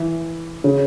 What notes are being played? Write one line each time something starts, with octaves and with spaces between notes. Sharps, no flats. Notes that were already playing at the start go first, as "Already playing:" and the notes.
Already playing: E3
C#3